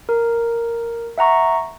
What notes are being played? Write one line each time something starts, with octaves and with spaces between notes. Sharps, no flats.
A#4
E5 F#5 A#5 C#6